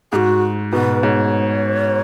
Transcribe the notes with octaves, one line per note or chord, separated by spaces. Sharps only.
G#2 F#4 G#4
G#2 B2 B4
G#2 C#5